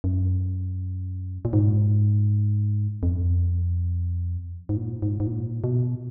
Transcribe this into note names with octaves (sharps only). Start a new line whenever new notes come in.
F#2
A#2
G#2
F2
G#2
A#2
G#2
G#2
A#2
B2